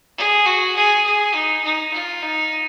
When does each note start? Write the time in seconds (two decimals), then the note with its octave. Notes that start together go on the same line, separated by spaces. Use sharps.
0.18 G#4
0.46 F#4
0.76 G#4
1.05 G#4
1.35 D#4
1.64 D#4
1.93 F4
2.22 D#4